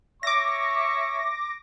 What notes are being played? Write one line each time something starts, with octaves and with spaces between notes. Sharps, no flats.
C#5 E5 C#6 D6 A#6